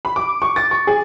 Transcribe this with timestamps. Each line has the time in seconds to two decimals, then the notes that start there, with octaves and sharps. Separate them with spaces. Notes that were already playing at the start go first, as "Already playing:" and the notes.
0.05 B5
0.16 D6
0.42 C#6
0.56 A6
0.71 C#6
0.87 G#4